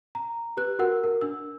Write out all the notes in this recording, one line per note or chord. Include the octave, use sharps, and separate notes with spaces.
A#5
G4 B4 F#6
F#4 A#4 F#5 E6
A#4
D4 E6